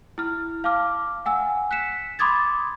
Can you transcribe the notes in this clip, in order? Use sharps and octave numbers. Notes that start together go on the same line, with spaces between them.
E4 F6
F5 A5 D6 F6
F#5 G#5 E6
F#6 B6 C#7 E7
B5 C6 D6 D#6 G#6 A6